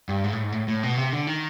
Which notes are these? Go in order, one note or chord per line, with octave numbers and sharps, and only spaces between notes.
G2
G#2
A2
G#2
A2
A2
B2
C3
D3
D#3